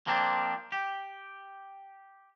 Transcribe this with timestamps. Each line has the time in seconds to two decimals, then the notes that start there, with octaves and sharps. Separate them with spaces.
0.07 F3 A#3 C4 D4
0.72 G4